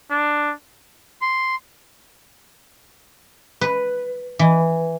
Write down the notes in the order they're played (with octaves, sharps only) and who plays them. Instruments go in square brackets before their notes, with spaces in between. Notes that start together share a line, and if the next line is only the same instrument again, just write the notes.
[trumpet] D4
[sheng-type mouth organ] C6
[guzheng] B4
E3